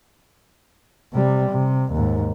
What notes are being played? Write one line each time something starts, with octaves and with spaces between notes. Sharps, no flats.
C3 G3
C3
D#2 G#2